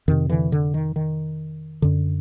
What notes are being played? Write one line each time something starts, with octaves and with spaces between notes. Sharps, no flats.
F2 C3 D#3
D3 E3
D3
D#3
D#3
F#2 D3